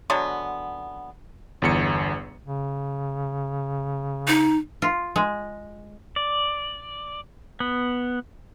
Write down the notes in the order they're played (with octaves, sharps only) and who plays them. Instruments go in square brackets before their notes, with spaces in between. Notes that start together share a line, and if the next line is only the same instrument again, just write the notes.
[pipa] D3 F#3 G#3 B3
[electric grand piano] G1 E2 C#7
[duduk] C#3
[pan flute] D#4
[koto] F4
G#3
[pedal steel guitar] D5
B3